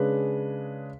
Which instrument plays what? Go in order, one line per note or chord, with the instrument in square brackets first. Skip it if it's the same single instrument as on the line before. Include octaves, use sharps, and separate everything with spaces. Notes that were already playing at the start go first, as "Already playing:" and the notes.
Already playing: [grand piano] C#3 G#3 D4 B4